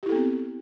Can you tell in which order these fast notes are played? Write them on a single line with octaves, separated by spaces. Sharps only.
G4 E4 A4 B3 C4